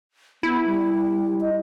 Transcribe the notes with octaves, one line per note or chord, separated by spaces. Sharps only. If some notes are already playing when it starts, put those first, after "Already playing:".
B3 E4
G3
D#5